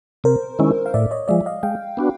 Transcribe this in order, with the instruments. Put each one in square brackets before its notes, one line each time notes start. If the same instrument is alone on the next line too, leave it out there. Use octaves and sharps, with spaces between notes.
[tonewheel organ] C3 [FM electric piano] A#4 C5
[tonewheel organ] D#3 G#3 C#4 E4
[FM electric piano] F5
[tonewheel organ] A2 [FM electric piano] D5 E5
[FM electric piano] C#5 D#5
[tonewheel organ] F3 G#3 [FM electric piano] D5 E5
[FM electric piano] D#5 F5
[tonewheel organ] G#3 [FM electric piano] F5 G5
[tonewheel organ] B3 D4 F#4